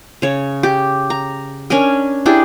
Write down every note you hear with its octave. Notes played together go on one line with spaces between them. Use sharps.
C#3 C#5
G4
A#5
C#4 D4 A#4 G#5
D4 E4 G4 G#4